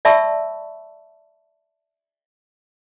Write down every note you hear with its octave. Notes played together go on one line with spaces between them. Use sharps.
D5 E5 A5 B5 C#6 E6